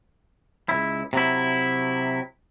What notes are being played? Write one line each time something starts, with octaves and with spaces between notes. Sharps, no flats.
C#2 F#2 E4
C3 F#3 E4